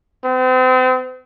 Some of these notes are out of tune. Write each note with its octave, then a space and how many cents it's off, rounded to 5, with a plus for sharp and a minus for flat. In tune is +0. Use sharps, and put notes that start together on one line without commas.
C4 -40